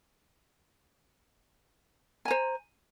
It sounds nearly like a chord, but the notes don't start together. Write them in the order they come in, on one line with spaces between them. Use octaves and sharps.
G#5 A#5 C5